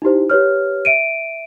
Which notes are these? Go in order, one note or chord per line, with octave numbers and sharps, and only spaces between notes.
D#4 E4 G4 C5
G4 B4 C#5 F6
E5 D7 D#7